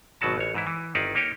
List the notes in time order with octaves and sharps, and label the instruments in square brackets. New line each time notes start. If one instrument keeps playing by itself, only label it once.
[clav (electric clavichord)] G#1 B2 F#3 F#4 A5
A1 C#5
G#2 E3 E4
E3
G1 D#3 D#4 E4 D5 F5
A#3 D#4 G4 C#5 G5